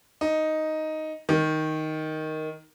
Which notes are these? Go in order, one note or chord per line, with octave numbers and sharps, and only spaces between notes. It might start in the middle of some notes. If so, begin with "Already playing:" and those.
D#4
D#3